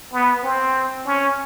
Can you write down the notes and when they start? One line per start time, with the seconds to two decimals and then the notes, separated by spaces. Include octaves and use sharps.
0.13 B3
0.43 C4
1.06 C#4